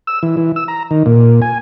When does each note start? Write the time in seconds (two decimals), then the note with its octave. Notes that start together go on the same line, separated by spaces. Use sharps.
0.07 E6
0.23 E3
0.37 E3
0.56 E6
0.68 A#5
0.91 D#3
1.06 A#2
1.42 G#5